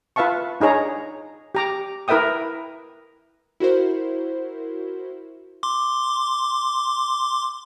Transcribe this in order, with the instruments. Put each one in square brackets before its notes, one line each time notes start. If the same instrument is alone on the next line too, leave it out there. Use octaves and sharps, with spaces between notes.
[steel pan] F4 B4 E5 F5 A5 C#6
D4 D#4 G#4 C#5 A#5
G4 A#5 D6
E4 A#4 B4 E5 G5 D#6
[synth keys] E4 F#4 A#4 C5
[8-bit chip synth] C6 D6